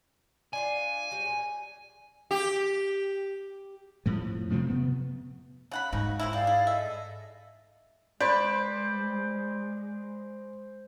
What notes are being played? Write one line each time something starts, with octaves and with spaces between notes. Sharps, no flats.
D4 F4 E5 G#5
F#3 G3 G#4
A#2
G4
F2 A2 F3
C3 F3 A3 C4
C3 B3
C#3 F#5 B5
G#2 C#3 D#4 F#4
C3 A#3 E4
G4 G#4 D5 F5
E4
A4 D#5 E5
G#3 B4 C5 D5